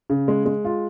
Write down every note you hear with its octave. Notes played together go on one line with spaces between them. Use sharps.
C#3
G#3
G#3
F4